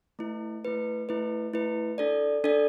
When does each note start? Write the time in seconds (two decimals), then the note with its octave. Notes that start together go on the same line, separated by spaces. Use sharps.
0.19 A3 E4 B4
0.65 A3 E4 B4
1.09 A3 E4 B4
1.53 A3 E4 B4
1.98 D4 A4 D5
2.44 D4 A4 D5